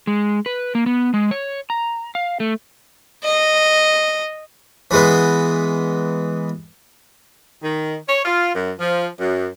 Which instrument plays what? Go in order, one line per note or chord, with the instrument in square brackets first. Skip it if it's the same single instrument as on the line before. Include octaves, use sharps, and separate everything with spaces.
[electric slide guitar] G#3
B4
A#3
B3
G#3
C#5
A#5
F5
A3
[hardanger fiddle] D#5
[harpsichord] E3 G#3 B3
[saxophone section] D#3
C#5
F4
F#2
F3
F#2